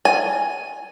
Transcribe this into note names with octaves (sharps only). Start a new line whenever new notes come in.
G#5